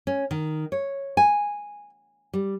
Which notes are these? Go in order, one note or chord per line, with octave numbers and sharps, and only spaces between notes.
C#4
D#3
C#5
G#5
G3